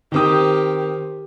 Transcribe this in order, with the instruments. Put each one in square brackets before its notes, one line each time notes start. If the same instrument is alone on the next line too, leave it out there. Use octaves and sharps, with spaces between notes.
[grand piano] D#3 C4 D#6 [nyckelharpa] G4 A#4